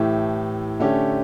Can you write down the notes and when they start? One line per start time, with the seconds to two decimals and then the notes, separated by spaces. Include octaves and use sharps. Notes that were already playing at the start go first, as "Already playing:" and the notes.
Already playing: A2 E3 A3 E4 G4
0.80 D3 A3 C#4 G4